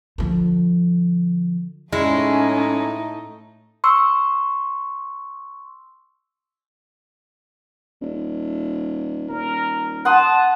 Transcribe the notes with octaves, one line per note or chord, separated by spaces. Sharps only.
D3 F3
A2 G#3 A3 C#4 D#4 E4
C6 C#6 E6
D#1
D#1 A#4
F#5 A5 C6 D#6